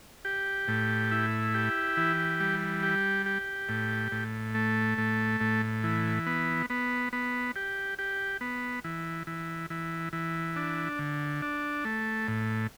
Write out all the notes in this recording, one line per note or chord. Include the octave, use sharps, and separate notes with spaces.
G4
A2
E4
G4
E3
G3
G4
G4
A2
A2
A3
A2
A2
E3
B3
B3
B3
G4
G4
B3
E3
E3
E3
E3
D4
D3
D4
A3
A2